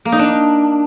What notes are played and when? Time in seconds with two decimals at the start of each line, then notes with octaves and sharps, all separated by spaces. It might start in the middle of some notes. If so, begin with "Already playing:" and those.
0.05 A#3
0.12 D#4
0.19 D4